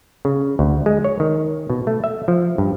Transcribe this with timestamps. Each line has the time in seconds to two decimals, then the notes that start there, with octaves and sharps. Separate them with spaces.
0.25 C#3
0.59 D2
0.86 G#3
1.04 C#5
1.20 D#3
1.70 B2
1.87 A3
2.04 E5
2.28 F3
2.58 G2